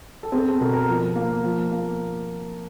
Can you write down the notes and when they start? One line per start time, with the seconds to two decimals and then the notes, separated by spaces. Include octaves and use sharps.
0.23 A4
0.32 C4 G#4
0.47 A4
0.60 B2 A#4
0.74 A#4
0.88 F3
1.16 A#3
1.44 F3
1.72 A#3